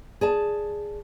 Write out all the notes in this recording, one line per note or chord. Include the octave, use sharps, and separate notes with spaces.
G#4 D5 A5